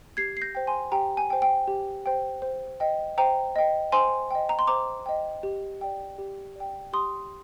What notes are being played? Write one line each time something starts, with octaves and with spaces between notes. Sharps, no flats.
G4 G#6 C7
C7
G6 A#6
C5 G5
G#5 C6
G4 G5 A#5
G#5
C5 G5
G5
G4
C5 G5
C5
D#5 G5
C5 G5 A#5
D#5 G5
C5 G#5 C6
D#5 G5
A#5
C6
C5 A#5 D6
D#5 G5
G4
D5 G5
G4
D5 G5
G4 C6 D#6